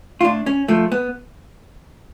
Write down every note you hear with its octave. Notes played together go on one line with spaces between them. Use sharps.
F4
A2 D4
C#4
F3 A3
B3